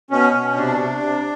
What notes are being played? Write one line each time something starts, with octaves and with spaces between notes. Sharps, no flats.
B2 C#4
B2
C3 D4
C3
C3